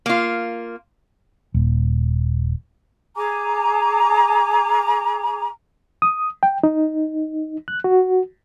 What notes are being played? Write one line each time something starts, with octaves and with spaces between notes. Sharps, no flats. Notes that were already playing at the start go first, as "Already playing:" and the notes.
A#3 F4
D#1
G#4 G#5 A#5 D6
D#6
G5
D#4
F#6
F#4